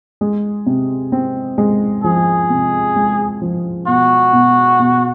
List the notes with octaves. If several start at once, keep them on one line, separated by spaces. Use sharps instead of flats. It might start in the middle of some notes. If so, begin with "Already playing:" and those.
G#3
C3
C4
G#3
F3 G#4
C3
G#3
F3
B2 F#4
B2
B2